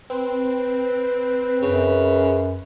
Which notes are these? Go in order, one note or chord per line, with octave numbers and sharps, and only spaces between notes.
C4 B4
F#2 C#3